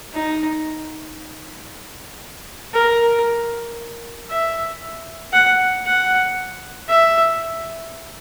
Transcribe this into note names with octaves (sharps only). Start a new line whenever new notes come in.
D#4
A#4
E5
F#5
F#5
E5